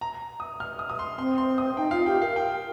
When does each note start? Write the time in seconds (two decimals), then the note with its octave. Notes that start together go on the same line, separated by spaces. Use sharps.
0.01 A#5
0.40 D#6
0.60 F6
0.79 D#6
0.89 D#6
0.99 C6
1.18 C4 C6
1.38 C6
1.58 D#6
1.77 D#4 G5
1.91 F4 F5
2.06 G4 G5
2.21 A#4 F5
2.36 G5